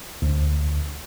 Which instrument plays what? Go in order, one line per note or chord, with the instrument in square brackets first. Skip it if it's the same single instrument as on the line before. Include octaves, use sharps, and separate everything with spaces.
[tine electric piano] D2